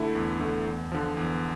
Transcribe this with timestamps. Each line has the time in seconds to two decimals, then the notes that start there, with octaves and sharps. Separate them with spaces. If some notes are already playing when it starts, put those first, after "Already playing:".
Already playing: D3 A3 E4
0.15 E2
0.40 D3 A3 E4
0.66 E2
0.92 D3 F3
1.17 E2